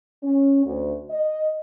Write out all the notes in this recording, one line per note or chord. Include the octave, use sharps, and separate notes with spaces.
C#4
D2
D#5